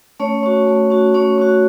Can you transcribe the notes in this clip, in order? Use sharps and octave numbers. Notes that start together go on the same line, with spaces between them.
A3 C#4 C#5
C#4 F#4
A3
C#4 F#4
A3 C#4 C#5
C#4 F#4